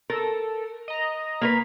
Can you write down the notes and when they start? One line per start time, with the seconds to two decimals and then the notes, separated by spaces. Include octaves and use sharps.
0.10 A4 A#4
0.88 D#5 A#5
1.41 A#3 A#4 B4